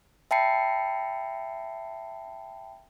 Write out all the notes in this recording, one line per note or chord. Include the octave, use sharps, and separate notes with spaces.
E5 G5 A5 B5 C7 C#7